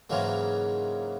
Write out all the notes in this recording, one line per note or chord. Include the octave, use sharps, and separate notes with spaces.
G#2 C#3 E3 F#3 G#3 A#3